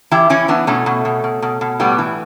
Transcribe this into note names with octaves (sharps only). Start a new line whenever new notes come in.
E3 E4 G4
E3 C#4 E4
E3 B3 D4
B2 A3 C#4
B2
B2
B2
B2
B2
A2 G3 B3
E3